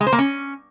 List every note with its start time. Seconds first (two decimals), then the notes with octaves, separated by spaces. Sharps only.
0.01 G#3
0.07 C5
0.13 A#3
0.19 C#4